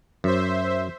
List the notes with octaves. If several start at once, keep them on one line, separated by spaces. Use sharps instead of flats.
F#2 C5 E5